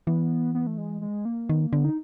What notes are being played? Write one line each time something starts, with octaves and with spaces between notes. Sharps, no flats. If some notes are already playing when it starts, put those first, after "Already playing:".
E3 B3
B3
A3
G#3
G#3
A#3
D#3 B3
A#3
D3 B3
D#4